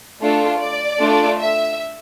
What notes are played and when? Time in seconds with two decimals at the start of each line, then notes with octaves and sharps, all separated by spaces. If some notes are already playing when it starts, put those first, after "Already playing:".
0.21 A3 D4 F4 A4
0.60 D5
1.00 A3 D4 F4 A4
1.40 E5